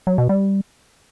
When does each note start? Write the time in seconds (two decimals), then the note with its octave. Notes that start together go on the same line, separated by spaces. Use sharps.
0.07 F#3
0.18 B2
0.29 G3